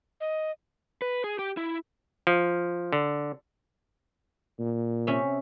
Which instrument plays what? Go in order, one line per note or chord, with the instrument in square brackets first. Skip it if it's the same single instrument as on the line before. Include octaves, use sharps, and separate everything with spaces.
[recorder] D#5
[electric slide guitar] B4
G#4
G4
E4
[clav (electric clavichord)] F3
D3
[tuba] A#2
[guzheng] C3 C#4 E5